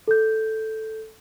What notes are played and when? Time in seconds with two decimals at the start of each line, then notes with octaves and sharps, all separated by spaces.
0.08 A4 G6